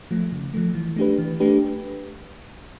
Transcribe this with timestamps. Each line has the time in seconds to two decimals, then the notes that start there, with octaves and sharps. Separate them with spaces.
0.11 F3 A3
0.32 C#3
0.54 F3 A3
0.75 E3
0.96 A3 D4 G4 B4
1.18 E3
1.40 A3 D4 G4 B4